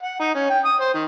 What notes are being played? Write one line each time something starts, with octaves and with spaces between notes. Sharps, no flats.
F#5
D#4
C#4
G5
D#6
C5
D#3